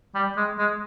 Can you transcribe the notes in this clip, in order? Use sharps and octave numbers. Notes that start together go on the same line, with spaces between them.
G3
G#3
G#3